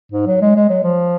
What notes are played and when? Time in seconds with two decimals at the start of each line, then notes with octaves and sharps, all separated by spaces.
0.12 G#2
0.26 F#3
0.41 G#3
0.56 G#3
0.69 F#3
0.83 F3